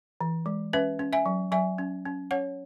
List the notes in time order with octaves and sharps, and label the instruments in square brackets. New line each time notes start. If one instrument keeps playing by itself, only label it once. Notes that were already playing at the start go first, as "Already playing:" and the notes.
[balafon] E3
G#3
C#4 B4 E5
C#4
E5 G#5
F#3
F#3 E5 G#5
C#4
C#4
C#4 C#5 F#5